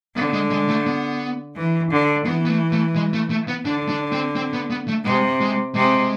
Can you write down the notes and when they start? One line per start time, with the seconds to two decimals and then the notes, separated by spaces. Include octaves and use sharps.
0.16 D3 B3
0.33 G#3
0.51 G#3
0.69 A3
0.86 B3
1.56 E3
1.91 D3
2.25 E3 B3
2.45 B3
2.49 A3
2.72 A3
2.95 G#3
3.13 A3
3.30 A3
3.48 B3
3.65 D3 D4
3.88 D4
4.12 C4
4.36 C4
4.53 B3
4.70 B3
4.88 A3
5.05 C3 G#3
5.41 G#3
5.75 C3 G#3